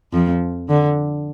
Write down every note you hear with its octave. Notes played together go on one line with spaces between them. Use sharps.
F2 F3
D3